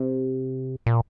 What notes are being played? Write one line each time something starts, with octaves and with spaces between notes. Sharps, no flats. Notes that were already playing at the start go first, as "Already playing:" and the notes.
Already playing: C3
A#2